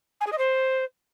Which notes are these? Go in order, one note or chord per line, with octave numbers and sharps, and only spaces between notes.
G#5
G#4
D#5
C5